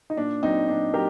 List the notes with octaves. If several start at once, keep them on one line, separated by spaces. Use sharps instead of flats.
D#4
A#2 D4
F#3 C4 D#4
A#2 D4
F#3 G4 A#4